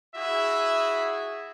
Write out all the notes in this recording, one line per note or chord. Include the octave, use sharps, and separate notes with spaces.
E4 F#4 G#4 E5